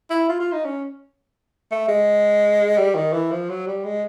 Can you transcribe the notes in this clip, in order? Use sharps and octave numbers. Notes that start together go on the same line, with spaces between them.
E4
F4
F4
D#4
C#4
A3
G#3
G3
D#3
E3
F3
F#3
G3
G#3